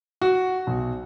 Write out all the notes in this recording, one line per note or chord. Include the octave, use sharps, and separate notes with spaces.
F#4
B1